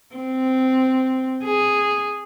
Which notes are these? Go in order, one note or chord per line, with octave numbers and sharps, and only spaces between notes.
C4
G#4